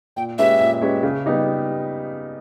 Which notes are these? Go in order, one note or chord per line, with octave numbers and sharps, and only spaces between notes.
A#2 G5
G#3 C#4 G4 B4 E5
A#2
G#3 C#4 G4 B4
C#3
G3 B3 D#4 G4